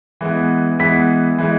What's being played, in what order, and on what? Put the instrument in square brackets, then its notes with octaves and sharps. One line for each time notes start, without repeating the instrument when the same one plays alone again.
[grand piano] E3 G#3 B3
E3 G#3 B3 B6
E3 G#3 B3